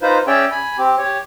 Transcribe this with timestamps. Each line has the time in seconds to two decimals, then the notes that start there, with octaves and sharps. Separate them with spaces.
0.02 D#4 F4 B4 C5
0.27 C#4 G#4 C#5 D5 E5 G5
0.51 G#5 B5
0.78 C4 G4
0.98 G4 C#5